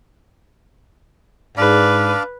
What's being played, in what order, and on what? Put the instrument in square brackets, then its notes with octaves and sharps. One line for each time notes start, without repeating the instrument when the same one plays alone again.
[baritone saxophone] G#2 [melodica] D4 D5 F5 [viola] B4